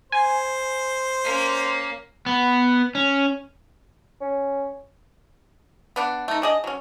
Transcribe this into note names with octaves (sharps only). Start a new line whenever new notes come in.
C5 G#5
A#3 C#4
B3
C#4
C#4
B3 D4 F#5
A3 D#4
D4 G#4 D#5
F#3 C#4